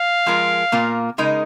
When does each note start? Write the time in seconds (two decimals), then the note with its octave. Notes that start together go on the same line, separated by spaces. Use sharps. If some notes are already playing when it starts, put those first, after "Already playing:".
Already playing: F5
0.26 F3 G#3 F4 A#4
0.72 A#2 A#3 F4 A#4
1.18 C#3 G#3 D#4 A#4